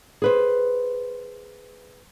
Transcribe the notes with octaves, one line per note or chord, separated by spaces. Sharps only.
G#4 B4 C5